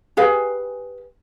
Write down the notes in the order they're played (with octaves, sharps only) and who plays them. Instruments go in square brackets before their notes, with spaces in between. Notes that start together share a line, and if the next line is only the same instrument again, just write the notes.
[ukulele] G4 G#4 B4 F5